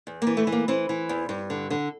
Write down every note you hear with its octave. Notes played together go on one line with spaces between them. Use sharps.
E2
A#3
E3
A3
E3
A#3
E3 C4
E3
E2
G2
D3
D3